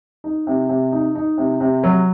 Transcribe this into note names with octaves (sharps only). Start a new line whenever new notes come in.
D#4
C3
C3
D#4
D#4
C3
C3
F#3